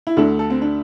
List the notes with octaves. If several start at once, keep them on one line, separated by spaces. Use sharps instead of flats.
E4
D2 D3 A3 D4
A4
C4
D4